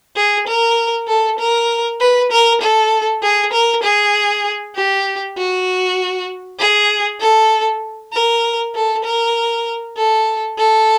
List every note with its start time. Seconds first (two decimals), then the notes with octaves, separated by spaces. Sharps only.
0.16 G#4
0.47 A#4
1.08 A4
1.38 A#4
2.00 B4
2.31 A#4
2.61 A4
3.22 G#4
3.53 A#4
3.83 G#4
4.75 G4
5.37 F#4
6.59 G#4
7.20 A4
8.13 A#4
8.74 A4
9.04 A#4
9.96 A4
10.58 A4